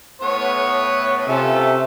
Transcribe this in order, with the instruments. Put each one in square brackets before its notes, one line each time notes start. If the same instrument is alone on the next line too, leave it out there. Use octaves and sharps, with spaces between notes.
[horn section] A2 B3 [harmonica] C#5
[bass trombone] C3 [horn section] C#4 F4 [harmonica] A4 E5